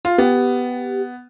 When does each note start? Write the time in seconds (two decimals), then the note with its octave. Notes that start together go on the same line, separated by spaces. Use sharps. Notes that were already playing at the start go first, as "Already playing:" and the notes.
0.05 F4
0.18 B3 G4